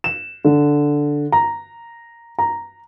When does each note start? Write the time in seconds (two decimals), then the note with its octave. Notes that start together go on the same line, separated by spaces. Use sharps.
0.04 E7
0.45 D3
1.32 A#5
2.39 A#5